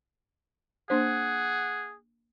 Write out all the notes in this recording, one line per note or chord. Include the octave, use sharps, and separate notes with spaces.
A#3 D4 G#4 C5 F#5